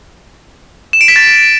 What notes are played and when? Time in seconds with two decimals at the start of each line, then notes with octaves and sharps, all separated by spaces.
0.93 E7
1.01 D7
1.08 B6
1.16 A6